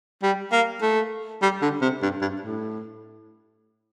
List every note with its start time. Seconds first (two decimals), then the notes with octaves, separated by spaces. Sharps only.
0.23 G3
0.52 A#3
0.82 A3
1.42 G3
1.62 D3
1.82 C3
2.02 G2
2.21 G2
2.42 A2